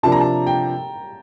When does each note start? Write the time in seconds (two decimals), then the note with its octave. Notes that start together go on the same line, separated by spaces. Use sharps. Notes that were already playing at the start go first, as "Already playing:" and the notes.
0.03 C3 F3 A#3 D4 A5
0.12 A#5
0.21 A5
0.47 G5